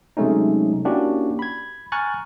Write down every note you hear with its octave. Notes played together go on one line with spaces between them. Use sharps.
C3 F#3 G#3 A3 C#4 D#4
A#3 C#4 D4 E4 F#4 G4
B5 G#6
G#5 A#5 C#6 F6 F#6 A6